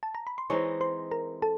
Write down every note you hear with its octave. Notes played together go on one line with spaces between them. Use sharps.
A5
A#5
B5
C6
E3 G#3 C4 D#4 C#5 C#6
C5 C6
A#4 A#5
A4 A5